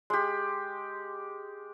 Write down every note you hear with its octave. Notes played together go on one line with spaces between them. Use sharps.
G#3 G4